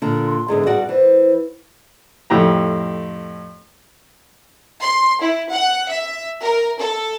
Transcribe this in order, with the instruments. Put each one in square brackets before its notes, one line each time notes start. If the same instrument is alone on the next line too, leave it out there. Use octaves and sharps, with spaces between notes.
[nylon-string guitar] A#2 D3
[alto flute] C6
[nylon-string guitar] E2 G#2 D3 [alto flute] G#4
[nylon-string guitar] G2 F#4 D5
[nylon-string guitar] E3 [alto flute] C5
[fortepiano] F2 A2 G4 A#5
[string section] C6
E4
F#5
E5
A#4
A4